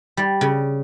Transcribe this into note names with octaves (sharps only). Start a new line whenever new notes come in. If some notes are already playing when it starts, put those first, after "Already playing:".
G3
C#3